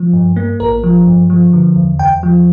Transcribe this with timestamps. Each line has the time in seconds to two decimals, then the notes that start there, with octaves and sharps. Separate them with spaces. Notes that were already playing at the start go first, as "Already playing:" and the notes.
Already playing: F3
0.13 G2
0.36 A#3
0.60 A1 A#4
0.84 F3
1.07 G2
1.30 F3
1.53 D3
1.76 E2
1.99 E2 G5
2.23 F3